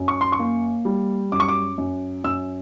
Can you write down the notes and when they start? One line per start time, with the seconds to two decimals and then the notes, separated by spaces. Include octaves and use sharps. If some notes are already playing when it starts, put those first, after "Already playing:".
Already playing: F#2
0.08 C#6
0.21 C6
0.32 C#6
0.39 A#3
0.85 G3
1.32 F#2 D6
1.40 C#6
1.48 D6
1.78 F#2
2.24 F#2 E6